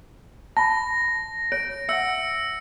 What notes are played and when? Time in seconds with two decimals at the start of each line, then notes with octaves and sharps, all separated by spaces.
0.57 A5 B5 A#6
1.52 C#5 D7
1.89 E5 F#5 E6 C#7